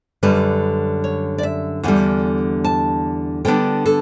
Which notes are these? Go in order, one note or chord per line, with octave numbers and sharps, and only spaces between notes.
F#2 D3 G3 B4
C#5
D5
E5
E2 D3 G3 F#5
A5
D3 G3 B3 D4 G5
A4